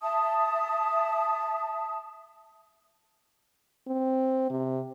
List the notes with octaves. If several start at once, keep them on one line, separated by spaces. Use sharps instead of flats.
E5 A5 D#6
C4
C3